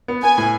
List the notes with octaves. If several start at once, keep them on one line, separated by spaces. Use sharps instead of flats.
B3
B3 G#5
A2